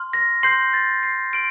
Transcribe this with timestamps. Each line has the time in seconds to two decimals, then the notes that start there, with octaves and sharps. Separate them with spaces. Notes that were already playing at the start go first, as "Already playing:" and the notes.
Already playing: C6 F6
0.13 A#6
0.43 C6 G6 C7
0.73 A6
1.03 C7
1.33 C6 F6 D7